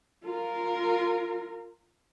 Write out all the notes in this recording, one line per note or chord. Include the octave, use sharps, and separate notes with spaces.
F4 A#4